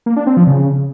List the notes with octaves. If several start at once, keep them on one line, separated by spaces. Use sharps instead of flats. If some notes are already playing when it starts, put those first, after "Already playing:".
A#3
D4
C4
F3
C#3